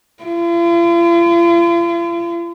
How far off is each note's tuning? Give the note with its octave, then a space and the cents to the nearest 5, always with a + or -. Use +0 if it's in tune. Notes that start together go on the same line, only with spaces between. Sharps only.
F4 -45